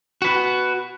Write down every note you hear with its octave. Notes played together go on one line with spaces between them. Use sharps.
F#4 B4